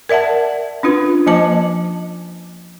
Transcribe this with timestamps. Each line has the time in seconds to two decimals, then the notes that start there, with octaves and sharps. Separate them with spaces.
0.09 A#4 D5 E5 F#5 A5
0.83 C#4 D4 F4 B4
1.27 F3 A#3 C5 D#5 A5 D6